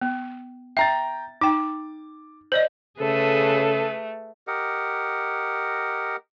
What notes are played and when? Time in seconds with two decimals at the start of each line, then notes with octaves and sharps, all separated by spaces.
0.01 B3
0.77 E5 G5 A#5 A6
1.41 D#4 G5 D6
2.52 C5 D5 D#5
3.00 C#3 A3 G#4 A4 B4
4.47 G4 A#4 D#5 F#5